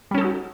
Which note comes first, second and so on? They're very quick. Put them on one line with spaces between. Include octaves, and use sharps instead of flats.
G3 C#4 A4 D#4 F#4